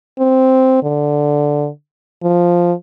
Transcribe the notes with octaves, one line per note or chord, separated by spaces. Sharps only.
C4
D3
F3